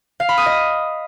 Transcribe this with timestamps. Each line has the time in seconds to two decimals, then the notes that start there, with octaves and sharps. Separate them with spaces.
0.20 F5
0.29 B5
0.37 D#6
0.46 D#5